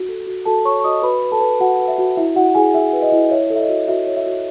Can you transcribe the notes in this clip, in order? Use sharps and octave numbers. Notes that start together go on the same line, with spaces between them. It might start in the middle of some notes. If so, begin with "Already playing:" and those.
Already playing: F#4
A4
F#4
F#4 A4 A5
C#5 C#6
C#6
F#4 D#5 D#6
F#4 B4 B5
B4
A4 A5
B4
F#4 F#5
B4
E5
F#4
E4 E5
E4 F#4 F#5
E4 G#4 G#5
G#4 E5
B4
D#5
E4
C#5 E5
A4
E5
D#5
F#4
F#4 E5
C#5
E5
F#4